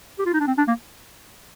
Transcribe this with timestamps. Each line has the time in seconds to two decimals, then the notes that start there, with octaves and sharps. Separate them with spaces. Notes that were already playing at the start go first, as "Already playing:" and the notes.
0.19 G4
0.26 F4
0.34 D#4
0.40 D4
0.47 C4
0.58 D4
0.68 A#3